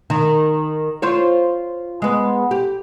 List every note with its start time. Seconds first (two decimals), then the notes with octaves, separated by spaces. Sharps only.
0.10 D#3
1.02 F4 C5 C#5
2.02 G#3 B3
2.51 G4